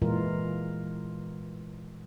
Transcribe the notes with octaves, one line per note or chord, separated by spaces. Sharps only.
A#2 E3 G#3 F4 A#4